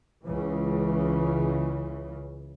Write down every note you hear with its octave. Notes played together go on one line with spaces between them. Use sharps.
C#2 C#3 E3